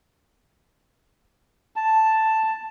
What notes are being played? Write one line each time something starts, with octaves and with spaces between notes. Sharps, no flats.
A5